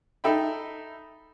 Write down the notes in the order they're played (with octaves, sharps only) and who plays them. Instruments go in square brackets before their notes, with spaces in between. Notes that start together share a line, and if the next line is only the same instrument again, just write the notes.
[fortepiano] D#4 A4 E5 G5 B5